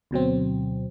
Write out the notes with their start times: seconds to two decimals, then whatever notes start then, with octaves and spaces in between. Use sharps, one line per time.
0.11 D2 B2 F#3 C4